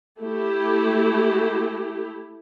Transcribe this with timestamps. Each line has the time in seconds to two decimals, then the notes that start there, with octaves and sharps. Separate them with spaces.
0.21 A3 E4 G4